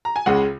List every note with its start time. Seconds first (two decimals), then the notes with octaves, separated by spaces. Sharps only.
0.05 A#5
0.16 G#5
0.26 C#2 C#3 G#3 F#5